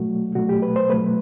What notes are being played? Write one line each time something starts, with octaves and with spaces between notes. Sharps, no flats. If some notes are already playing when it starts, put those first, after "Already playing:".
Already playing: B2 F#3 A3 F#4
B2 F#3 A3 F#4
G4
B4
C5
B2 F#3 A3 B4